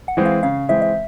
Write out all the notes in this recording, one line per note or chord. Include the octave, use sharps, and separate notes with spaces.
F#5
E3 G#3 C4
F5
C#3 F5
E3 G#3 C4 E5
E5